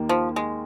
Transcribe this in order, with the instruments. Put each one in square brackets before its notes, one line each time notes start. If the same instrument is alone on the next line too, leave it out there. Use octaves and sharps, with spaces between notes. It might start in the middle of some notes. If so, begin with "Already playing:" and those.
Already playing: [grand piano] D#2 D#3 A#3
[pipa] F3
G#3